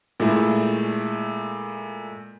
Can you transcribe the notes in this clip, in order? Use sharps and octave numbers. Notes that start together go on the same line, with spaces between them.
A#2 G#3 A3 E4